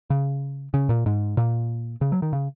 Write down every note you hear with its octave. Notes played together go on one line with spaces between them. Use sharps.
C#3
C#3
A#2
G#2
A#2
C#3
F#3
D#3
C#3